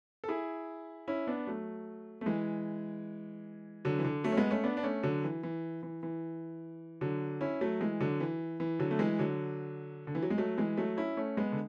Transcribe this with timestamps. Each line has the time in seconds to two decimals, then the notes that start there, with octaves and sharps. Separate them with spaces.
0.24 A4
0.29 E4 G#4
1.08 C#4 E4
1.27 B3 D4
1.47 F#3 A3
2.21 A3
2.26 E3 G#3
3.85 D3 F#3
3.99 E3
4.04 D3
4.24 F#3 A3
4.32 C#4
4.37 G#3 B3
4.51 A3 C#4
4.64 B3 D4
4.77 D4
4.83 A3 C#4
5.03 D3 F#3
5.24 E3
5.43 E3
5.83 E3
6.03 E3
7.01 D3 F#3
7.41 C#4 E4
7.61 F#3 A3
7.81 E3 G#3
8.01 D3 F#3
8.20 E3
8.60 E3
8.79 D3 F#3
8.91 A3
8.99 E3 G#3
9.19 D3 F#3
10.07 D3
10.15 E3
10.23 F#3
10.30 G#3
10.38 F#3 A3
10.58 E3 G#3
10.77 F#3 A3
10.97 C#4 E4
11.17 A3 C#4
11.37 G#3 B3
11.52 D3